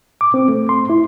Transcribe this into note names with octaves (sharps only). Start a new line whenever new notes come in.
D6
C4
A3
C6
E4